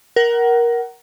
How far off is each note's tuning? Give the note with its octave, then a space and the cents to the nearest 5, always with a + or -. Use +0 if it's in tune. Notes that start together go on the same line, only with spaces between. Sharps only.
A#4 +15 F#5 +25